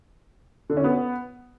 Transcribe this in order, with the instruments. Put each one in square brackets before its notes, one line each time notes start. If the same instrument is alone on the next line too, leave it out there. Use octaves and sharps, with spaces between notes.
[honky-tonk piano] D3
C#4
B3